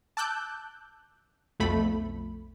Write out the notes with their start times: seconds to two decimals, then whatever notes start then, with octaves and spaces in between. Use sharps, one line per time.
0.17 A5 D6 E6 F#6 G6
1.60 B1 F2 A3 B5